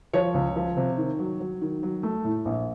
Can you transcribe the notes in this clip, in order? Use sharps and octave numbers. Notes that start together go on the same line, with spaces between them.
F3 C#5
C#2
F3
C3
D#3
F#3
F#3
D#3
F#3
A3
A2
A#1